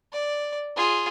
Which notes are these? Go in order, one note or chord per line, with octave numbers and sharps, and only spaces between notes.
D5
F4 G#4